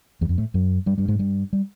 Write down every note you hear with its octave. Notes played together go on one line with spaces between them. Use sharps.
E2 E3
F2 F3
A2 A3
F#2 F#3
G2 G3
G2 G3
G#2 G#3
G2 G3
G3